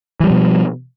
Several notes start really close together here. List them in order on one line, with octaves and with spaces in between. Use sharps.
E3 G3 F3 B2